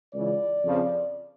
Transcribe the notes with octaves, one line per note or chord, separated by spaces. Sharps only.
C#2 C#3 E3 D5
F2 C#3 F3